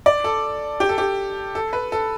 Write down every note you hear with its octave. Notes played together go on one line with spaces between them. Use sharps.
D5
A4
G4
A4
G4
A4
B4
A4